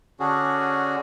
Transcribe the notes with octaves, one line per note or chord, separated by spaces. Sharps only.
D3 C#4 D4 F#4 G#4